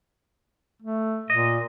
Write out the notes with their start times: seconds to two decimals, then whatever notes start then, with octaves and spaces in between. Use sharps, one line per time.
0.82 A3
1.30 A#2 D#5